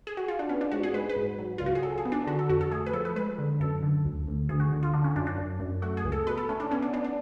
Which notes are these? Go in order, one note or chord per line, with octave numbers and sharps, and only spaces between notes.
G#4
F#4
F4
D4
B3 C#4
D4
G#2 F#4
G#4
G#3 B4
B4
G#2
F#3
C#2 F4
F#4
G#4
F#3 A4
G#4
B3
D4
D3 F#4
A4
F2 F#4
A4
A3 G#4
B4
F3 A4
B4
G#3 B4
D3
F#2 A4
D3
D2
D2
D2 G#4
F#4
D3
F4
D3 D4
C#4
F#2 D4
D4
F#2
F#2
A3 F#4
G#4
C#2
A4
B2 B4
A4
A3 C#4
D4
B3 C#4
D4
B3 D4
D4